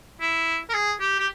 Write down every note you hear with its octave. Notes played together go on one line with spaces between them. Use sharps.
E4
A#4
G#4
G4
G4